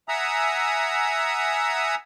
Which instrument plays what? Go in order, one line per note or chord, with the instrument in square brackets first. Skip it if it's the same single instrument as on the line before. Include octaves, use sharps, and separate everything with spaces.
[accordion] E5 F#5 G#5 A#5 D#6 E6